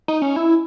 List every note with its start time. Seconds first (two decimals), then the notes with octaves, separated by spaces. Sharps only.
0.08 D#4
0.22 C#4
0.36 E4